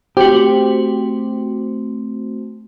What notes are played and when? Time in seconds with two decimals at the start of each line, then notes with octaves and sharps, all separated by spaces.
0.17 A3 C4 F#4 G4 C5